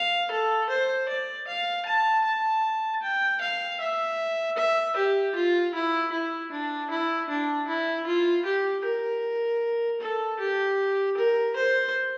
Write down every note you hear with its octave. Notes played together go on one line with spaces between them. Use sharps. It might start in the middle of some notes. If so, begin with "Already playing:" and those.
Already playing: F5
A4
C5
D5
F5
A5
A5
G5
F5
E5
E5
G4
F4
E4
E4
D4
E4
D4
E4
F4
G4
A#4
A4
G4
A#4
C5